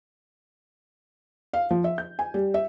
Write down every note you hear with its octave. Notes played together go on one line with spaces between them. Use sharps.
F5
F3
E5
G6
G#5
G3
E5